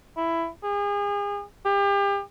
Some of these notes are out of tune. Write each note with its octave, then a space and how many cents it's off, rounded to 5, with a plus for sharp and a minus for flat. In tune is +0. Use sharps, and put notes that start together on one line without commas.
E4 +10
G#4 -35
G4 +35